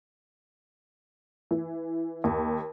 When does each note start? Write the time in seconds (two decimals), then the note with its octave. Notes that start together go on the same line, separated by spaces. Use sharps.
1.51 E3
2.24 D#2